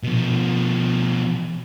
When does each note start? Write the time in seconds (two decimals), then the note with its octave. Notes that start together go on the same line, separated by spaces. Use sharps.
0.03 B2 F3